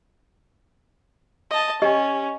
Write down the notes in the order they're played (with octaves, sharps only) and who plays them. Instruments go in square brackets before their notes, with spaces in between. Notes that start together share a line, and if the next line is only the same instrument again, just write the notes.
[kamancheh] D#5 A5
[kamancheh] C#4 [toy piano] G4 D#5